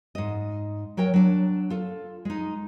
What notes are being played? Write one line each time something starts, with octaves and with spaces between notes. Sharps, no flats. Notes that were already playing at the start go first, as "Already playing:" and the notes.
G#2 D#5
F#3 A#4 C#5 G5
F#3 D4
F4 A4
G#3 D#4